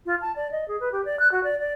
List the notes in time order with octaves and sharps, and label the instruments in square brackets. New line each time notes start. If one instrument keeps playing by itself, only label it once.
[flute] F4
A5
D5
D#5
G#4
B4
G4
D5
F#6
F#4
D5
D5